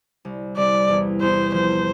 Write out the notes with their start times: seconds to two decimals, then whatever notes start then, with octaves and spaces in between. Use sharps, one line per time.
0.25 C2
0.57 C2 D5
0.90 E2
1.21 E2 C5
1.54 F3 C5